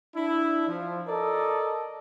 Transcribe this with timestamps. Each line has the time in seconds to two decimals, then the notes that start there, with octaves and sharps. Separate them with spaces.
0.15 D4 E4
0.68 F3
1.08 A4 A#4 D5 D#5